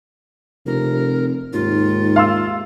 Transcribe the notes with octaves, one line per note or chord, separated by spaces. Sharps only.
F1 C3 A#4
D#2 G#2 F4
F5 C6 E6